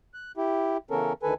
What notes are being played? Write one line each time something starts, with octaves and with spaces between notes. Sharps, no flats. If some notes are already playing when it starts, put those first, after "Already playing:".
F#6
E4 G4
C#3 E3 B3 C#4 A4 A#4
D2 D#3 A4 B4 G#5